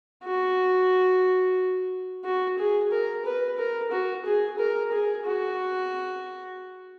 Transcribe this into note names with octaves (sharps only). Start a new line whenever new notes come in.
F#4
F#4
G#4
A#4
B4
A#4
F#4
G#4
A#4
G#4
F#4